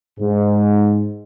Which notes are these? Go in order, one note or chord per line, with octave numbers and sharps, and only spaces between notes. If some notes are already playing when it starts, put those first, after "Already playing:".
G#2